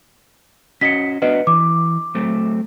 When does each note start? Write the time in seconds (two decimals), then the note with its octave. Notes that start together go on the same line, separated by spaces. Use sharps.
0.81 C#4 F#4 D#5 B6 C#7
1.22 B3 D4 F#4 B4 D#5
1.47 E3 D6
2.15 F#3 A3 C4